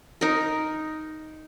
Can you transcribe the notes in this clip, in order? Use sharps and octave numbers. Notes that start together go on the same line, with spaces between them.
D#4 A#4